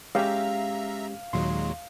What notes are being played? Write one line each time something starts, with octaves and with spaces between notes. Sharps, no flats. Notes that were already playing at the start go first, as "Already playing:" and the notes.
G#3 C#4 G4 E5 F5 A#5
D#2 A#2 F#3 G#3 C6